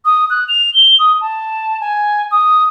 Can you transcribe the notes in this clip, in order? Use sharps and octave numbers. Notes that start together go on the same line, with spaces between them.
D#6
F#6
F7
G7
D#6
A5
G#5
D#6